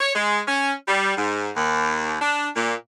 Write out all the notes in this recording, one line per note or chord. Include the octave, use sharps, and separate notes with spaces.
C#5
G#3
C#4
G3
G#2
D#2
D4
A#2